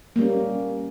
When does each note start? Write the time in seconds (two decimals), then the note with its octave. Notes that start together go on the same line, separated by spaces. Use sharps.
0.16 A#3
0.19 G3
0.21 C#4